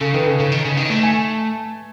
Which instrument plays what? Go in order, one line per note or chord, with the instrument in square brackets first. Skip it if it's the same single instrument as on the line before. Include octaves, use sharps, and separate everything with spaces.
[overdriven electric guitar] C#3 [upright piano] A4
[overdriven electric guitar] D#3 [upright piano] B4
[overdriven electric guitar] C#3 [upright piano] A4
[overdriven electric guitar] C#3
D#3
C#3
D#3
A3
[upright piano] G#5